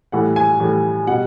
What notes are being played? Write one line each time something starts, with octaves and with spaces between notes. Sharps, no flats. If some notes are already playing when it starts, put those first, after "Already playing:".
A2 E3 G3 F#5
G#5
A2 E3 G3
B2 G3 F#5